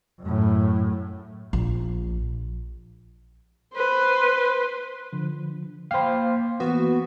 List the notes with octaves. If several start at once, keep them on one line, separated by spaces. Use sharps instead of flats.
F#2 A2
A#1
B4 C5
D3 F3
A#3 C5 F5 G5 B5
E3 A#3 B3 F#4